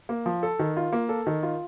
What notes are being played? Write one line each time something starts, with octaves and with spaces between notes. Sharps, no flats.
A#3
F3
A4
D#3
F4
A#3
A4
D#3
F4